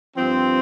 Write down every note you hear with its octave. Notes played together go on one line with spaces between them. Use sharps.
G2 F3 C4